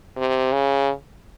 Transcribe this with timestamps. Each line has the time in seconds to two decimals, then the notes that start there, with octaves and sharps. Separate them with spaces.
0.17 C3
0.52 C#3